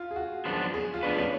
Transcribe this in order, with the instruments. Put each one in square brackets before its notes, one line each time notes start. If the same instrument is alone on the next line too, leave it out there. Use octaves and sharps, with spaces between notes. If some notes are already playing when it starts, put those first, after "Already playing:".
Already playing: [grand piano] F4
G#4
F#4
[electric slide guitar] F#2 F3 B3 D4
[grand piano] G#4
F4
[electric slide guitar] A2 F3 B3 F#4 B4 [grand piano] D4
[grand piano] C#4